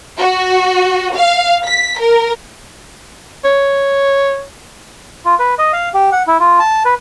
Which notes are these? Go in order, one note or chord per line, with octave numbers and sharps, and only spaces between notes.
F#4
F5
B6
A#4
C#5
F4
B4
D#5
F5
G4
F#5
E4
F4
A5
B4